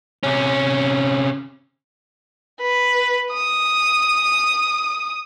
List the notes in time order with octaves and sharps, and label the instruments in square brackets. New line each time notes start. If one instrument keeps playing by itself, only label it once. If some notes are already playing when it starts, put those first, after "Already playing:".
[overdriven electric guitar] C3 C#4
[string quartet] B4
D#6